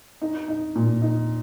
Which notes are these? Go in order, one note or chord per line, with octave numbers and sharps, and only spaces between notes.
D#4
D#4
A#2
D#4